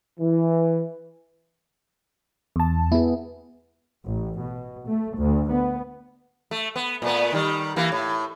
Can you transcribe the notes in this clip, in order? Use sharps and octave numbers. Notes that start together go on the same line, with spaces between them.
E3
E2 A5
B3 E4 G#4
A1
B2
A3
D2
B3
A3
B3
A#2 A3 B3
D#3 G3
E3 A#3
A2